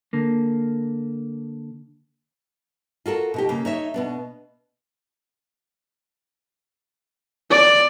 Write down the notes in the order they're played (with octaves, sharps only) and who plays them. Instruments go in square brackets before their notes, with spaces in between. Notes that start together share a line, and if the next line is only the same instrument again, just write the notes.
[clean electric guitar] D3 A#3
[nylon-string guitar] F4 F#4 A4 A#4
B2 D#4 G4
C#3 A#3
D#4 C#5 E5
B2 B3 D4
[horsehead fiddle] D5